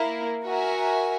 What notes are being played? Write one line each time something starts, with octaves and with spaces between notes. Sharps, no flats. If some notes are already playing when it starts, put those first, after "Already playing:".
Already playing: A#3 E4 A#4
F#4 A#4 E5 G#5